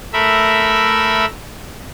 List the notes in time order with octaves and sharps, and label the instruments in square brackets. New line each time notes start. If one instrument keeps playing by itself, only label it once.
[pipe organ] A3 A#4 E5 B5